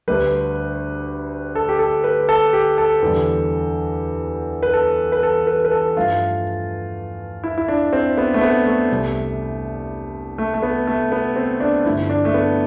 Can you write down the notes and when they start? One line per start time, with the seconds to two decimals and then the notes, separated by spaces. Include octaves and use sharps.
0.08 D2 D3 G3 B4
1.55 A4
1.69 G4
1.79 A4
2.04 B4
2.29 A4
2.53 G4
2.78 A4
3.02 E2 D3 G3
4.63 B4
4.73 A4
5.12 B4
5.23 A4
5.47 B4
5.65 B4
5.71 A4
5.96 G2 F3 A3 F4
7.44 E4
7.58 E4
7.68 D4
7.93 C4
8.18 B3
8.34 A3
8.41 B3
8.66 A3
8.91 C2 C3 G3
10.38 A3
10.54 A3
10.63 B3
10.87 A3
11.12 B3
11.36 C4
11.60 D4
11.86 G2 D3 F3 A3 E4
12.10 D4
12.25 A3
12.34 B3